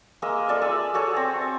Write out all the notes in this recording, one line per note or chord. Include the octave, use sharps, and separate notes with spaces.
G#3 A#3 D#5 E5
F4 A4 D5 E5
G#4 E5
F#4 G#4 A4 C#5
C4
E5